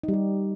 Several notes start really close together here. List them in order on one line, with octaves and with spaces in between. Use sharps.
D#4 G3 G4